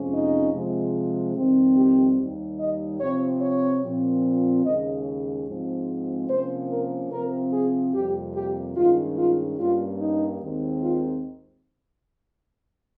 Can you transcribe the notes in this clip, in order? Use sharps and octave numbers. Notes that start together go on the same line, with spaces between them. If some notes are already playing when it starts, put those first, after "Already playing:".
Already playing: F2 C3 F3 G#3 C#4
D#4
C3 F3 G#3
F2 D#3 G3 C4
G4
D#2 D#3 G3
D#5
C3 F3 C4 C#5
C#5
A#2 F3 C4
D#2 C#3 G#3 C#4 D#5
G#2 F3 G#3 C4
C3 F3 A#3 C#4 C5
A#4
C3 F3 C4 A#4
G#4
F2 C3 G3 A#3 G4
G4
G2 D#3 G#3 C#4 F4
F4
G2 G3 A#3 C#4 F4
D#4
D#2 D#3 G#3 C4
F4